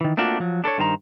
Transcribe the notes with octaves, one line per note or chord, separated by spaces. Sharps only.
D#3 E3
A3 A#3 C4 D4 F4 F#4
F3 F#3
D4 A4 B4 C#5
G2 D#3 C5 A5 A#5